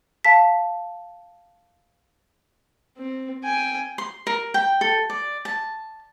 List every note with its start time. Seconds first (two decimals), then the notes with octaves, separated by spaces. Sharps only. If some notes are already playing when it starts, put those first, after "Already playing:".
0.24 F5 A5 B6
2.98 C4
3.44 G5 G#5
3.98 C6
4.27 A#4
4.54 G5
4.81 A4
5.10 D5
5.45 A5